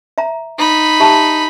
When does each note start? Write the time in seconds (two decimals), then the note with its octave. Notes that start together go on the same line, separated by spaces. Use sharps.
0.18 E5 A#5
0.59 D#4 B5
1.00 G4 E5 A5